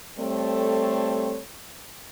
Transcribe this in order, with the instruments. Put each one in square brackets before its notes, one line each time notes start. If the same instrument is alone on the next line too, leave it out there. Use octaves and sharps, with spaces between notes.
[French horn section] G3 A3 C4 A4 C#5